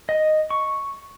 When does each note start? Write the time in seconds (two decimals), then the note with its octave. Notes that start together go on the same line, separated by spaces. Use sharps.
0.09 D#5
0.50 C#6